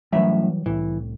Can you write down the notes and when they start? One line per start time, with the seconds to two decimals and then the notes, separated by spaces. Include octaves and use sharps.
0.12 F#2 A2 E3 F#3 G3 E5
0.66 C2 A2 E3